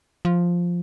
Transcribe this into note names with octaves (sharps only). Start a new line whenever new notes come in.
F3